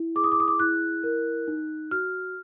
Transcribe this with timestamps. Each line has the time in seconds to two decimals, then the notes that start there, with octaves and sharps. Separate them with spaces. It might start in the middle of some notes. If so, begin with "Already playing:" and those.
Already playing: E4
0.15 G#4 D6
0.24 D#6
0.32 D6
0.40 D#6
0.48 D6
0.59 E4 F#6
1.04 A#4
1.47 D#4
1.91 F#4 F6